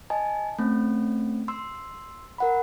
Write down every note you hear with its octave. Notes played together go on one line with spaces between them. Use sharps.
D#5 G#5 A5
A3 C4 C#4
C6 E6
A#4 F#5 B5